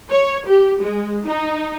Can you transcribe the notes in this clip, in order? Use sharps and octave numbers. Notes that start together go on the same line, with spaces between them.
C#5
G4
G#3
D#4